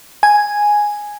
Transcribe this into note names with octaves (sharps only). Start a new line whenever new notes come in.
G#5